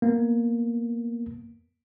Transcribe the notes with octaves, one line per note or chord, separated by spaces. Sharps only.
A#3 B3